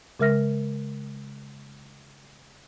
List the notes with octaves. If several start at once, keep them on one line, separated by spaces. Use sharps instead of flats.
C#3 G#3 A#4 E5 F6 A#6